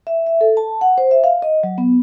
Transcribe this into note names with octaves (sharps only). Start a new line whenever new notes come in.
E5
E5
A4
A5
F#5
C5
E5
F5
D#5
F#3
B3